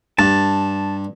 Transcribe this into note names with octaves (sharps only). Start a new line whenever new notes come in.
G2 A5